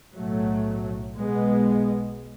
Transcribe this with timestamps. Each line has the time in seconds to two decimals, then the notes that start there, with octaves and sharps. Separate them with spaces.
0.14 B1 A2 F#3 A3
1.17 B1 B2 G#3 B3